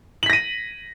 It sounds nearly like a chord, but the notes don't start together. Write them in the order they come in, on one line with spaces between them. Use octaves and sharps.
F#7 B6 A#6 D#7